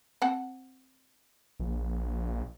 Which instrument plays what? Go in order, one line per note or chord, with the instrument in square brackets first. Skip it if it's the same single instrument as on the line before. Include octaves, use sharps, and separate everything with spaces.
[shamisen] C4 F#5 A5
[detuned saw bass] A#1